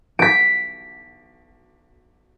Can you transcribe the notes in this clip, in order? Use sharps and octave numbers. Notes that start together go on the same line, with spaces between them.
B6 D7